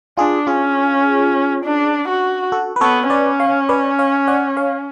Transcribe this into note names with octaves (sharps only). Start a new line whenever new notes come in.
D4 F4 G#4
C#4 F4 G#4
D4
F#4
F#4 A4
B4
B3 A4 C#5
C#4 B4 D5
C#5 F5
B4 D5
C#5 F5
D5 F#5
C#5 F5